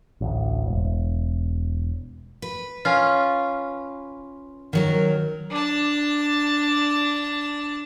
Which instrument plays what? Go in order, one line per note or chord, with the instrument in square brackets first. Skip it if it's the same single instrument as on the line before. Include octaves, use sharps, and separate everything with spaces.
[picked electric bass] A1 D2
E1
[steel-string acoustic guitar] B4
[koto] C#4 F4
[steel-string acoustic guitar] D#3 F#3 A#4
[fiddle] D4 A5